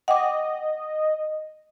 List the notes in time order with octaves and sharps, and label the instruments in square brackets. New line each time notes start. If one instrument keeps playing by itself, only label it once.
[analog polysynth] D#5 [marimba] F#5 G5 D6